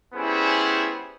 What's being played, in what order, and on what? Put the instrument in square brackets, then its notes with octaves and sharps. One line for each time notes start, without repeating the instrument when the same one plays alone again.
[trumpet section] G3 B3 C#4 E4 G#4 C5